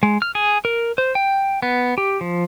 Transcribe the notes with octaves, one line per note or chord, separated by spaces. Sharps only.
G#3
F6
G#4
A#4
C5
G5
B3
G4
F3